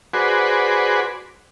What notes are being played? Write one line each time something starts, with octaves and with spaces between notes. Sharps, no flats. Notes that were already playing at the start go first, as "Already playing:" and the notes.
F#4 G#4 B4 C5 D5